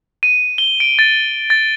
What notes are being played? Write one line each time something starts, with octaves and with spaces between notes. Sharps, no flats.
D#7
G7
D7
A6
A6